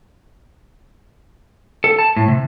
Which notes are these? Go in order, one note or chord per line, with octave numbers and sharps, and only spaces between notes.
A4
A5
A2
C3